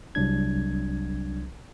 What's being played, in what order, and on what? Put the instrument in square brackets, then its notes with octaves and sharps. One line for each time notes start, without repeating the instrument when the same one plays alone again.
[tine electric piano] C2 F#3 D4 G#6